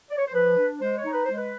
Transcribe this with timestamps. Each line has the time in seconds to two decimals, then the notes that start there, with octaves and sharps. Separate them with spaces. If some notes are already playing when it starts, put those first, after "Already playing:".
0.10 D5
0.18 C#5
0.26 C5
0.33 F3 B4
0.57 D4
0.81 G#3 C5
0.98 C#5
1.05 D#4
1.13 B4
1.25 G#3 C5
1.37 B4